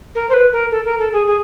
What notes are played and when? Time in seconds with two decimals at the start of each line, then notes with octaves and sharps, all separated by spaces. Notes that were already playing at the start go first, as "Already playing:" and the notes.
0.15 A#4
0.29 C5
0.34 B4
0.52 A#4
0.71 A4
0.85 A#4
0.99 A4
1.13 G#4
1.27 G#4